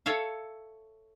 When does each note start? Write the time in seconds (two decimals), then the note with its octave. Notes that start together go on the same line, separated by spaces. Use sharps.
0.06 A4 C#5 E5 F5